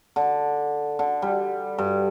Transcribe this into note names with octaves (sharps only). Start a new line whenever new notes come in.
D3
D3
G3
G2